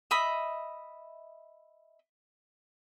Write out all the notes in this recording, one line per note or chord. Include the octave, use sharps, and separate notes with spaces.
D#5 E5 B5 D#6